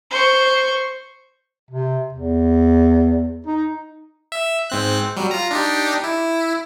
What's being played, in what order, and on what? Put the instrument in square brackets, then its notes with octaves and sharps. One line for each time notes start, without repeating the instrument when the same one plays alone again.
[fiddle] C5 C#6
[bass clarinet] C3
E2
D#4
[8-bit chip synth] E5
G#2 C4 F#6
F#3 G3
F4 A#5
D4 D#4 G4
E4